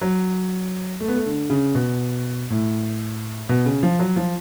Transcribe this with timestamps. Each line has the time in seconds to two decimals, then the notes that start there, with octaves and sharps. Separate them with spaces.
0.02 F#3
1.00 A3
1.08 B3
1.16 A3
1.26 D3
1.50 C#3
1.75 B2
2.50 A2
3.49 B2
3.66 C#3
3.83 F3
4.00 F#3
4.16 F3